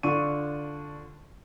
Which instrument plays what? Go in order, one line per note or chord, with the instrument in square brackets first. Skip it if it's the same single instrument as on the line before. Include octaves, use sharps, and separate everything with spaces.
[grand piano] D3 D4 F4 C#6 D#7